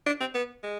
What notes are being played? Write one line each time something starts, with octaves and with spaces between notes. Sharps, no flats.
D4
C4
B3
G#3